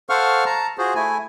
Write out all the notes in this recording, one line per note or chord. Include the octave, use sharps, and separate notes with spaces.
A4 C5 F5 F#5 C#6 F6
A5 A#5
F4 F#4 G#4 C5
A3 E4 G#5